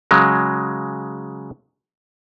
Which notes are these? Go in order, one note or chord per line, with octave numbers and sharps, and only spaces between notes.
C#3 F#3 G#3